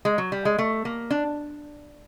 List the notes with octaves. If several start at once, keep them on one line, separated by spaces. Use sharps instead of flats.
G#3
F#3
G3
G#3
A3
A#3
D4